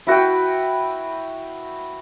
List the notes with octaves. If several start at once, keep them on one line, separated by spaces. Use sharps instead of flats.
E4 F#4 B4 G5